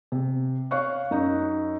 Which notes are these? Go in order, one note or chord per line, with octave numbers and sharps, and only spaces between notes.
C3
C#5 F5 C#6 F#6
F#2 D#4 D#5